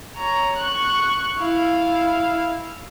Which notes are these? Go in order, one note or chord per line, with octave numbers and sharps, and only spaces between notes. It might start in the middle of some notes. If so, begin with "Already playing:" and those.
C#5 A#5
C#6 F#6
E4 F5